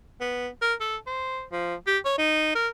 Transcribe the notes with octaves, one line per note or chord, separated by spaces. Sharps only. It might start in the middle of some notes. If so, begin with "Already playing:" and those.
B3
A#4
A4
C5
F3
G4
C#5
D#4
A#4